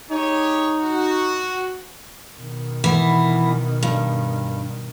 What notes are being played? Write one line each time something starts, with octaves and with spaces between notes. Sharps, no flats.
D#4 G4 G#4 C#5
F#4
B2 D#3
E3 B3
G2